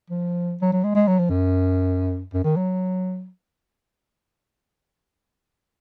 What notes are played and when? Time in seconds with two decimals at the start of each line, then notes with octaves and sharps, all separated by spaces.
0.10 F3
0.62 F#3
0.72 F#3
0.84 G#3
0.95 G#3
1.07 F#3
1.19 F3
1.30 F#2
2.34 F#2
2.44 D#3
2.56 F#3